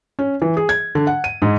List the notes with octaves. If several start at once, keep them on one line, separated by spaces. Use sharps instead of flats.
C#4
E3
G#4
G#6
D3
F#5
D#7
G#2